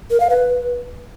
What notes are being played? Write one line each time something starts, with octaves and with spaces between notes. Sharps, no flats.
A#4
F5
B4